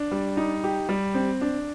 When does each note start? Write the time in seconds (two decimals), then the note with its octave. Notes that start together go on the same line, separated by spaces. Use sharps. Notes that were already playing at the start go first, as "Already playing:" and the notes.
Already playing: D4
0.11 G3
0.37 D#4
0.64 G4
0.89 G3
1.14 C4
1.41 D4